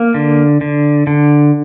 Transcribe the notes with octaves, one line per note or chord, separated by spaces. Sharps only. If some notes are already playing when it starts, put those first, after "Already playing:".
Already playing: A#3
D3
D3
D3